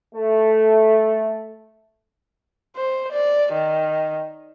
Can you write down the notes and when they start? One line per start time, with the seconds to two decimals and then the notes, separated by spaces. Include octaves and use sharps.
0.15 A3
2.76 C5
3.12 D5
3.53 D#3